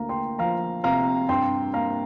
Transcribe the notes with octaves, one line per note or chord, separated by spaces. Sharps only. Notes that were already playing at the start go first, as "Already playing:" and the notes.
Already playing: D2 A#3 F5 A#5
G5 C6
F3 F5 A#5
C3 F5 A#5
G2 G5 C6
A#3 F5 A#5